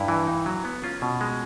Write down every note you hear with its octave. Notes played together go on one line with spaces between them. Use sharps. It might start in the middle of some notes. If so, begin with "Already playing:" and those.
Already playing: G2 E4
E3
D#4
F#3
B3
C#4 F4
B2
G#3